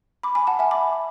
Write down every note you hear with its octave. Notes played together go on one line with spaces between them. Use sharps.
B5 D6
G#5 B5
F#5 A5
E5 G#5
B5 D6